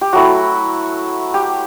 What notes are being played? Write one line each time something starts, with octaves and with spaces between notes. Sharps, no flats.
G4
F#3 A3 E4 F#4
G4